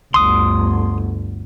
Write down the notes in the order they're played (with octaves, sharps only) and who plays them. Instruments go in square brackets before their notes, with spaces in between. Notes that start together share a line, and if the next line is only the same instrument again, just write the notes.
[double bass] G1 D2 [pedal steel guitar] C6 D#6